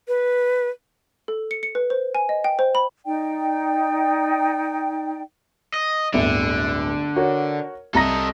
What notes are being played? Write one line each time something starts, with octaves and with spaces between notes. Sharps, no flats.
B4
A4
C#7
C#7
B4
C5
G#5
D#5
G5
C5
B5
D#4 D5 G5
D#5
D1 G1 D3 E5
F#4 A#4 C#5
C2 A4 D#5 A#5 A#6